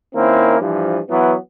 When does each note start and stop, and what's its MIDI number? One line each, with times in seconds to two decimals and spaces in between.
0.16 0.59 51
0.16 0.59 58
0.16 0.59 60
0.16 0.59 61
0.16 0.59 64
0.60 0.98 43
0.60 0.98 52
0.60 0.98 53
1.10 1.34 52
1.10 1.34 54
1.10 1.34 59